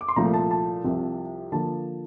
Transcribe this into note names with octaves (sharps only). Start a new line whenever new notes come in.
D6
C6
C2 A#2 F3 A3 A#5
A5
A5
C2 C3 F3
D3 F3 A#3 A5